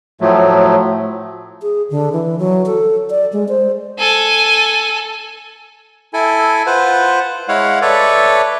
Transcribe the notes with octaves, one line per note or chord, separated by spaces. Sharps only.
A2 F3 F#3 A3
G#4
D3
E3
F#3
A4
D5
G#3
C5
A4 G#5
E4 A4 G#5
F4 B4 C5 F#5
G#3 E4 C#5 F5 F#5
A4 B4 C#5 D5 E5